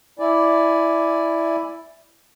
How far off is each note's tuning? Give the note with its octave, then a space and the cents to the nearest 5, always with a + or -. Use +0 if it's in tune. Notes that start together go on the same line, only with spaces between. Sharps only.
E4 +0 D5 +0 G#5 +5